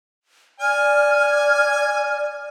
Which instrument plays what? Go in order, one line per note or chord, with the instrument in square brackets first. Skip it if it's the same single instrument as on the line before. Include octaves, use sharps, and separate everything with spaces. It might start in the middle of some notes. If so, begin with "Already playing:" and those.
[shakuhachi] D5 [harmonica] G#5 [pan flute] F6